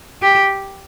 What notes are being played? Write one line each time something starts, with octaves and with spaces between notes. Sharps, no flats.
G4